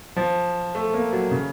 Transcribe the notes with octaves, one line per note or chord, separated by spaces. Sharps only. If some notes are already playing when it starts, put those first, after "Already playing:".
F3
A3
A#3
F#3
C#3